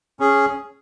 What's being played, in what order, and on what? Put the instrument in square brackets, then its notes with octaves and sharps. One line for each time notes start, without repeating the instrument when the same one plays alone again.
[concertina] C#4 G#4